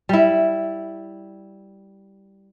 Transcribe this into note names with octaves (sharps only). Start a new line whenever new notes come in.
G3 E4